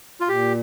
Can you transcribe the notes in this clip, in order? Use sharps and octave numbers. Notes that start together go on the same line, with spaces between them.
F4
A#2 G4